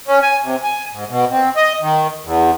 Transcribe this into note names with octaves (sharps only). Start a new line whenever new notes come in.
C#4
G#5
C3
G#5
G#2
B2
C4
D#5
D#3
E2